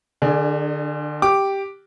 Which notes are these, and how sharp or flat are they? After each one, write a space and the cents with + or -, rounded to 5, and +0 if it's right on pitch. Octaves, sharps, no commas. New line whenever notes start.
D3 +35 D4 +5 G#4 +0
G4 +0 D6 +0